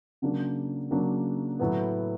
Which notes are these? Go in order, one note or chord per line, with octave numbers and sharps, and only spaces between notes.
C#3 F#3 A#3 D4
C#3 F#3 A#3 D4
A2 F#3 B3